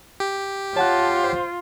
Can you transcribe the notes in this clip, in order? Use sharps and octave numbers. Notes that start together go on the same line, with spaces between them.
G4
F4 C#5 F#5 A5 F#6
C5